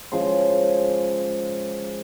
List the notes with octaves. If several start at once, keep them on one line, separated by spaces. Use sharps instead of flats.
C#3 F3 G#3 C6